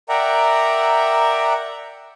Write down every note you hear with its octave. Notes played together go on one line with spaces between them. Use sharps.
A#4 D5 E5 F#5 G5 A#5